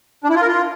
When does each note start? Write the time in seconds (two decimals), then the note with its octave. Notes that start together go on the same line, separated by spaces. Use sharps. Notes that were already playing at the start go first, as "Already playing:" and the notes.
0.24 D4
0.30 E4
0.36 F4
0.42 A#4
0.47 F4